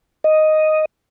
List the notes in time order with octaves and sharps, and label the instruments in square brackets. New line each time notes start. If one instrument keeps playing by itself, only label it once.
[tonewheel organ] D#5